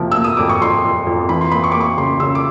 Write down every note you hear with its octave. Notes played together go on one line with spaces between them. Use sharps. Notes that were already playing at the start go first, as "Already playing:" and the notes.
Already playing: F2 C3 F3 A#3
A#3 E6
D#6
F2 D6
C#6
F2 C6
F2
F2
E3 B5
C6
A#3 B5
C#6
A#3 D6
C#6
C#3 C6
C#3 E6
D6